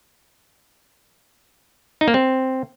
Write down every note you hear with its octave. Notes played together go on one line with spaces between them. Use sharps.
D#4
A#3
C4